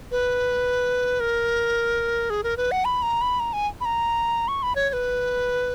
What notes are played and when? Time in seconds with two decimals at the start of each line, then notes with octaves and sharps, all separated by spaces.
0.11 B4
1.20 A#4
2.30 G#4
2.44 A#4
2.57 B4
2.71 F#5
2.85 B5
3.02 A#5
3.21 B5
3.40 A#5
3.53 G#5
3.81 B5
3.85 A#5
4.48 C#6
4.63 B5
4.76 C#5
4.90 C#5
4.93 B4